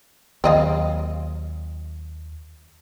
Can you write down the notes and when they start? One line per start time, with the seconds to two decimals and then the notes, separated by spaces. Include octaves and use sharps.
0.44 D#2 F#3 C4 D#5 F5